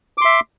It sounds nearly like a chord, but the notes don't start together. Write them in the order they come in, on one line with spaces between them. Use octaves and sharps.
D6 C6 E5